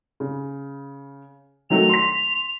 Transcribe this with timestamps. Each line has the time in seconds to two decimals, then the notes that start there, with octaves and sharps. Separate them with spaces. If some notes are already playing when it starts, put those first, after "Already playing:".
0.20 C#3
1.70 D#3 F#3 A3 F7
1.89 C6 B6